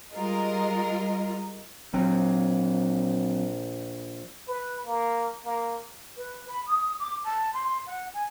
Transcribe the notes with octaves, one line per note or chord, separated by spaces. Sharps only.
G3 G#3 F4 A#4 D#5
A#1 F#3 C4
B4
A#3
A#3
B4
B5
D#6
D6
A5
C6
F#5
G#5